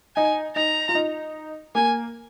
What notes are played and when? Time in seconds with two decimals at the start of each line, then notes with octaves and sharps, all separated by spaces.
0.16 D#4 G#5
0.56 D#4 A#5
0.89 F4
0.95 D#4
1.75 A#3 G#5